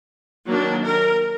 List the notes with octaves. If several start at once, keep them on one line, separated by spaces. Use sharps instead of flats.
D#3 F#3 A#3 D4
A#4